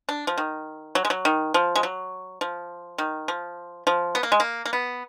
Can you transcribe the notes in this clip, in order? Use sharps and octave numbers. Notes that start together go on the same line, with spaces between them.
D4
F3
D#3
F#3
G#3
F#3
D#3
F3
G#3
F#3
F3
D#3
F3
F3
B3
A#3
G#3
A#3
A#3
B3